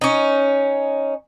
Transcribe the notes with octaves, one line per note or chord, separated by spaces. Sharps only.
C#4 D#4